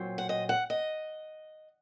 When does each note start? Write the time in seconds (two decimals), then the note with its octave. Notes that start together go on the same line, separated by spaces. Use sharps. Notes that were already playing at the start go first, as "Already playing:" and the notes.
Already playing: A#2 F#3 C4
0.18 F#5
0.29 D#5
0.49 F#5
0.70 D#5